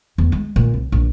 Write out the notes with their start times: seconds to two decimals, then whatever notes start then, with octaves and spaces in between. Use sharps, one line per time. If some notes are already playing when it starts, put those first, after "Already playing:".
0.18 E2
0.32 G#3
0.56 A#2
0.74 C2
0.92 A#1